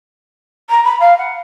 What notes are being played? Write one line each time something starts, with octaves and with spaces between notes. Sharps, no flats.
A#5
B5
F5
F#5